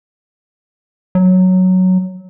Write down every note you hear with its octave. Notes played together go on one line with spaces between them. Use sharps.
F#3